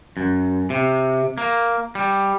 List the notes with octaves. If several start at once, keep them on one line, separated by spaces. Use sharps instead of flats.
F#2
C3
A#3
G3